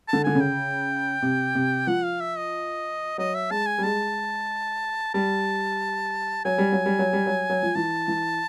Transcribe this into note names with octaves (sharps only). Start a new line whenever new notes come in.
D3 A5
D3 G#5
C#3
G5
C3
C3
F3 F#5
F5
E5
D#5
F#3 D#5
E5
G#3 A5
G#5
G3
G#3 A5
G3 A5
F#3 G#5
G3
F#3
G3
F#3
G3
F#3
F#3
F3
E3 A5
E3